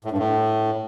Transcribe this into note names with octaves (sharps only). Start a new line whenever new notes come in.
A2
G2
A2